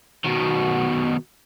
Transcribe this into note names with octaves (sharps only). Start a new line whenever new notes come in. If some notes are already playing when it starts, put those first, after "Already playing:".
B2 D#3 F#4